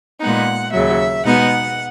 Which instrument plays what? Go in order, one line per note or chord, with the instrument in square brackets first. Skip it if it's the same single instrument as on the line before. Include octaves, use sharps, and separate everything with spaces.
[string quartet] A#2 G#3 B3 D#4 F#5
D#2 C#3 F#3 E5
B2 G#3 B3 D#4 F#5